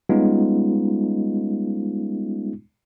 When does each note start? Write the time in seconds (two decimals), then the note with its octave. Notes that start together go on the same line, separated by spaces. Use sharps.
0.09 G3 G#3 B3 C#4 D#4 F4